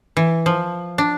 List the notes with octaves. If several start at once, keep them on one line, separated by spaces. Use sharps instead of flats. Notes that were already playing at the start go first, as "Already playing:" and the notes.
E3
F3
D4